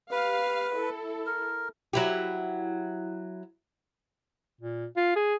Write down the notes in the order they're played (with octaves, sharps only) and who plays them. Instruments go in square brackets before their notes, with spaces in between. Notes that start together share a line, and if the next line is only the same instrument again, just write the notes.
[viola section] G4 F5 [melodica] B4
[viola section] E4 A4
[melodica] A#4
[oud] F#3 E4 G4
[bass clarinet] A#2
F4
G#4